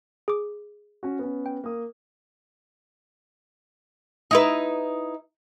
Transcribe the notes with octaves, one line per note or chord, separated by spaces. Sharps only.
G#4 D6
C#4 F#4
B3 C#4
G5
A#3 D#6
D#4 E4 B4